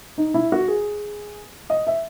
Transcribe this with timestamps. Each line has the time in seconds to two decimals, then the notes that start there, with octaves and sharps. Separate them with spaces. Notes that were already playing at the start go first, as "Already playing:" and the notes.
0.18 D#4
0.34 E4
0.52 F#4
0.68 G#4
1.70 D#5
1.87 E5